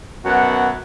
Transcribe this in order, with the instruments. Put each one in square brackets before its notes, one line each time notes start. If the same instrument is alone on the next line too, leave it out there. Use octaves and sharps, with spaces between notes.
[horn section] F#2 B2 F#4 F#5